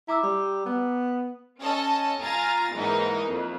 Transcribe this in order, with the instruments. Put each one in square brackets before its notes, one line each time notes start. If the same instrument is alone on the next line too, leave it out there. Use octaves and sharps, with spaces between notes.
[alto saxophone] E4 [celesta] A#5 D6 E6
[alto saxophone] G3
B3
[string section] C#4 A4 D#5 A5
F4 G#5 A#5 A6
G#2 E3 A#3 D#4
F2